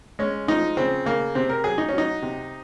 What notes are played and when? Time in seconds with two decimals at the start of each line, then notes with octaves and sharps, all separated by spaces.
0.19 G#3 C#4
0.48 F3 D#4
0.77 C#3 C4
1.06 C#3 A#3
1.35 C3 C4
1.49 A#4
1.64 F#3 G#4
1.78 D#4
1.89 F#3 C#4
1.98 D#4
2.22 C3